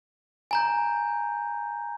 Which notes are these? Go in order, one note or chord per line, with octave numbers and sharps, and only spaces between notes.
G#5 A#5 G6